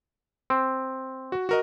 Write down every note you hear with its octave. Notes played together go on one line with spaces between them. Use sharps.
C4
F#4
F#4 A#4 D#5